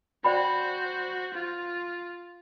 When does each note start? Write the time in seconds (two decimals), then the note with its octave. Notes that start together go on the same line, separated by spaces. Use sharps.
0.24 F#4 C5 D5 G5 B5
1.34 F4